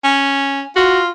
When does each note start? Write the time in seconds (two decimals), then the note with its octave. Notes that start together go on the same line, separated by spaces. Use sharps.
0.04 C#4
0.76 F4 F#4